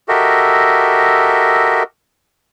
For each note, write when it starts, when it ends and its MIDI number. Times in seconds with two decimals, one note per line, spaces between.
0.09 1.83 66
0.09 1.83 67
0.09 1.83 69
0.09 1.83 70
0.09 1.83 75
0.09 1.83 76